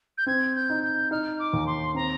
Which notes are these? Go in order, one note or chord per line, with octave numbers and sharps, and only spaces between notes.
G6
C4 G#6
G6
D#4
G6
D#4 F6
D6
D#2
C6
C4 A#5